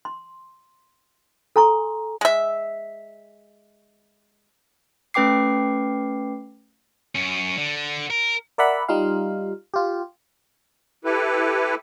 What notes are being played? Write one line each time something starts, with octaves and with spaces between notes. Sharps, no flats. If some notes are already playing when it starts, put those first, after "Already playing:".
C6
A4 G#5 A#5 C6 C#6
G#3 E5
A3 C#4 B4 G5 D6 C7
F#2 C#4
D3
A#4
A#4 D5 E5 F#5 B5
G3 D#4 F4 F5
F4 G4
E4 G4 A4 B4